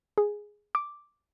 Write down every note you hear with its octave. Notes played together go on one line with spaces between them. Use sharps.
G#4
D6